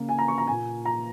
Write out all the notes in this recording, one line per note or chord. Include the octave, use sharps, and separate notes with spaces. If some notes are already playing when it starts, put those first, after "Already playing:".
Already playing: C#3 A#3
G#5
A#5
C#6
A#5
A#2 A#3 G#5
A#5